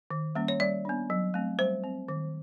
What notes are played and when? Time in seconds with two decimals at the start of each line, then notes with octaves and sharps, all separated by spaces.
0.10 D#3
0.35 G3 A#3 C#4
0.48 C#5
0.60 G3 D5
0.85 B3 D4
1.10 F#3
1.34 A3 C4
1.59 G3 C5
1.84 C4
2.08 D#3